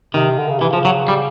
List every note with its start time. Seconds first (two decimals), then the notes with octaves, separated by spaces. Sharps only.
0.14 C3 D#3
0.38 D3
0.49 C#3
0.59 C3 E3
0.71 C#3 F3
0.85 F#3
1.08 G3